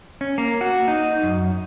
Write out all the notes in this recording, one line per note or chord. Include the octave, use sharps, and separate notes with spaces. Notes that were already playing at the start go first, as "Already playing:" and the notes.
C#4
A#3
F#4
D#4
F#2